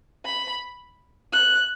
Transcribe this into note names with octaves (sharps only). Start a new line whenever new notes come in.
B5
F#6